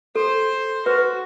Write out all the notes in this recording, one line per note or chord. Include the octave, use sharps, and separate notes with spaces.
A4 C5
F#4 B4